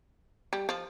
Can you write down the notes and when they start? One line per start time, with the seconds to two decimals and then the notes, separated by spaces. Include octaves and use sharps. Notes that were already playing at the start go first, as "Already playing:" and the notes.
0.53 G3
0.69 F3